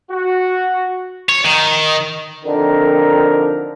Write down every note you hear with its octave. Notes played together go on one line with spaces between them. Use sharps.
F#4
C#5
D#3
F2 D3 D#3 A#4